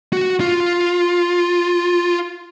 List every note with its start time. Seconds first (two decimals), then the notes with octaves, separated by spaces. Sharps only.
0.13 F#4
0.40 F4